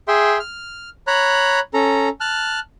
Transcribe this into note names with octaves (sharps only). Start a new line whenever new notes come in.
G#4 E5 G5 C6
F6
C#5 A#5 B5 F#6
C#4 A4 A#5
A5 F6 F#6